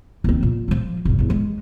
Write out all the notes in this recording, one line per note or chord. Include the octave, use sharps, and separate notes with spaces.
D#2 C4
A#2
F3 G#3
E1 G2
A1 E2
G#3